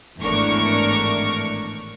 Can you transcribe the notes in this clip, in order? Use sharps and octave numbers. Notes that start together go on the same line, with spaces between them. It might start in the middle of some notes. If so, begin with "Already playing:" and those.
G#1 E2 A2 D4 A#4 C#6